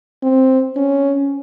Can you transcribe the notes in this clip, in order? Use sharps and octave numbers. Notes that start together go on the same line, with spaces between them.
C4
C#4